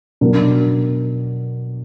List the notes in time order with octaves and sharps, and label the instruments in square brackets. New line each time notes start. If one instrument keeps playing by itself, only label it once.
[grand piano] B2 F#3 D4 F#4 A#4